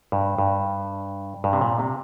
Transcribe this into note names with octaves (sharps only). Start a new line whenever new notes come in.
G2
G2
G2
C3
A#2
C3